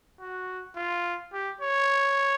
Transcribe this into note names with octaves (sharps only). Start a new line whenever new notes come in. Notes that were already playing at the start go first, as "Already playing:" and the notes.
F#4
F4
G4
C#5